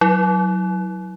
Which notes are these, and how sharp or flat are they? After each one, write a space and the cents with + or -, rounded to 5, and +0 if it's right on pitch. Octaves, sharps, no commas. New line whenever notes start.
F#3 +0 E4 -25